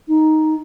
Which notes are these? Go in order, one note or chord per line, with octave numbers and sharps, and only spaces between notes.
D#4